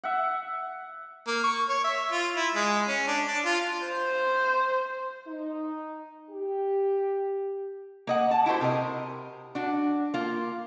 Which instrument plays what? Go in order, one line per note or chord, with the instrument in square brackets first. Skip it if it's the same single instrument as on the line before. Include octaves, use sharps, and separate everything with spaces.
[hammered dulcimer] E5 F#5
[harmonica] A#3
C#6
C#5
E5
F4
E4
G#3
C#4
D4
D4
F4
[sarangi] C5
[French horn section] D#4
G4
[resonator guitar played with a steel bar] A#3 D#5 F#5
A5
E4 F#4 G4 C5
C3 A#4 D#5
D4 F#4
A#3 F4